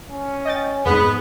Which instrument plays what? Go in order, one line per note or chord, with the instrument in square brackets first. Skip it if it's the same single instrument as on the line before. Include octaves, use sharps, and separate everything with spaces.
[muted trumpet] C#4
[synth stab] D#5 G5 A6
[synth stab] F2 G#2 [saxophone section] B3 [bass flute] G#4 [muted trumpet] B4